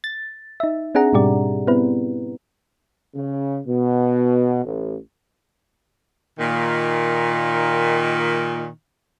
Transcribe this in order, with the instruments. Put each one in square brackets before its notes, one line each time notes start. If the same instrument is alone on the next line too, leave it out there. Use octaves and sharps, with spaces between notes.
[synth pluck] A6
D#4 E5
C4 D4 G#4 F#5 A#5
G#2 B2 G3 G4 D5
B3 C4 E4 B4
[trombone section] C#3
B2
A1
[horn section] A#2 D#3